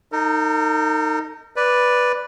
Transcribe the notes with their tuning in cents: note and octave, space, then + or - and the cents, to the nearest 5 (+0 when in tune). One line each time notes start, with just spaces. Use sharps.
D#4 +0 A#4 -45
B4 +0 D5 +0